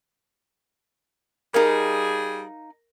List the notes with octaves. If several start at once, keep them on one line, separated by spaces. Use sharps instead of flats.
G3 D#4 G#4 A#4 F5